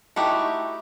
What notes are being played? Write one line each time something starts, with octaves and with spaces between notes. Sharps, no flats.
A3 D#4 E4 F#4 G4